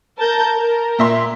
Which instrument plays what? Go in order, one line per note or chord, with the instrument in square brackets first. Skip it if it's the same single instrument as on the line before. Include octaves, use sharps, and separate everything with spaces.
[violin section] A#4 A5 G6
A#4
[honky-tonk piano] A#2 E5 C6